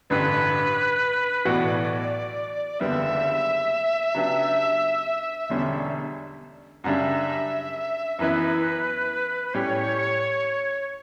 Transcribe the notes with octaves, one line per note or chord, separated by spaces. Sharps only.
A1 G2 D3 B4
B1 A2 E3 B3 F#4 D5
F#1 E2 D3 G3 B3 E5
C#3 F#3 B3 D4 G4
E1 E2 D3 G3 C#4
F#2 C#3 G3 D4 E5 F#5
F#2 E3 B3 E4 B4
A2 G3 C#4 G4 C#5